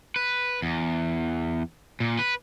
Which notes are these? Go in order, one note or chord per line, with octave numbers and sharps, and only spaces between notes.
B4
E2
A#2
B4